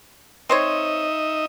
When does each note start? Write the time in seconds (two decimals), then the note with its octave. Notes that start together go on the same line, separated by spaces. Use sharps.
0.49 C4 D#4 C5 C#5 D#5 E5